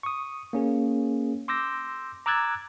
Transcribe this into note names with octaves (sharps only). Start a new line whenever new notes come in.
C#6 D#6
A#3 C#4 G#4
C6 D6 E6 G6 A#6
A#5 D6 E6 F#6 G#6 A6